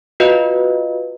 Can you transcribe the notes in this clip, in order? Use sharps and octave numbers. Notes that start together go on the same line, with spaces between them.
F4 F#4 B4 D#5 F5